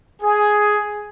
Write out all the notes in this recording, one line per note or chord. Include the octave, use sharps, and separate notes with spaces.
G#4